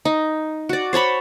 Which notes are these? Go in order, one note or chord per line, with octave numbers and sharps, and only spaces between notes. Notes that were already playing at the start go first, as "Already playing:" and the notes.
D#4
F#4 D5
C5 C#5 A5 B5